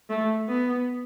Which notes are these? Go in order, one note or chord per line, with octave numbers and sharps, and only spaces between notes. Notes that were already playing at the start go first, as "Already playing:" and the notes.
A3
B3